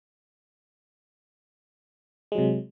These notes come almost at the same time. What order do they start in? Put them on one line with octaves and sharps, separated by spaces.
G#3 F#3 C3